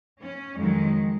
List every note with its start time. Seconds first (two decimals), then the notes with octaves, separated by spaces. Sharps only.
0.20 C#4
0.57 F2 D#3 F#3 G#3